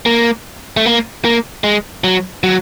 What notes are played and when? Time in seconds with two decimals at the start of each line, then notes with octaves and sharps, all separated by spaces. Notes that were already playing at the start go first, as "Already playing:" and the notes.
0.06 A#3
0.77 A3
0.86 A#3
1.25 A#3
1.64 G#3
2.04 F#3
2.44 F#3